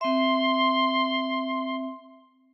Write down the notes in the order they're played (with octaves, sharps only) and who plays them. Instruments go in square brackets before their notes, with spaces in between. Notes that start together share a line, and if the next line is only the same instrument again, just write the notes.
[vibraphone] C4 E5 [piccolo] C6